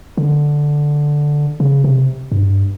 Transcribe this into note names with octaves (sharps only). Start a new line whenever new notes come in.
D3
C#3
C3
G2